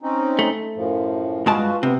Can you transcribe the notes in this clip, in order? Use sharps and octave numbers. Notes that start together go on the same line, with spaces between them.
C4 C#4 D#4
A3
F#2 A2 F3
G2 G#3 F4 F#4 B4 A5
C3 B3